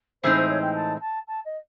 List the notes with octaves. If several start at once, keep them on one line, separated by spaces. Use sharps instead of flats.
A2 E3 G#3 C4 D#4 C5
C5
C#5
G5
A5
A5
A5
D#5